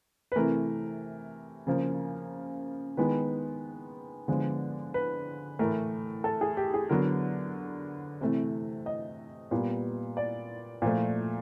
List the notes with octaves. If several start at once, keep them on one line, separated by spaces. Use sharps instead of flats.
B4
C3 E3 A3 A#4
C#3 F3 A#3
D#3 G#3 B3 B4
D3 F3 G#3 B3
B4
A2 E3 A3 A#4
A4
G#4
G4
G#4
D3 F#3 B3 A#4
C3 E3 A3
D#5
A#2 G3 B3
D5
A#2 F3 A3